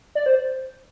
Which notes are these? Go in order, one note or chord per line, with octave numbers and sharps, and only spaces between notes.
D5
C5